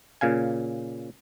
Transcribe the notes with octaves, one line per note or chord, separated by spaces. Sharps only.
A#2 C#3 F5 G#5